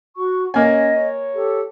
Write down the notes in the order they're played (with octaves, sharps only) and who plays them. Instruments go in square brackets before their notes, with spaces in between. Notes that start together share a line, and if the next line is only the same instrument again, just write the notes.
[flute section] F#4 C#6
[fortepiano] A#3 G#5 [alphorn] C#4 [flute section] D#5
[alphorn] C#5
[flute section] G4 A4